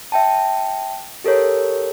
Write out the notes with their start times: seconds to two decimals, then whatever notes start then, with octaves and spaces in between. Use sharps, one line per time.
0.12 E5 G5 A5
1.24 G4 A4 A#4 C#5